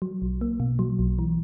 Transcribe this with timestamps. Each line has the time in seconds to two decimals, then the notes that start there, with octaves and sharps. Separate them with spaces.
0.02 F#3
0.22 B1
0.41 A#3
0.60 B2
0.79 F#3
0.99 B1
1.19 E3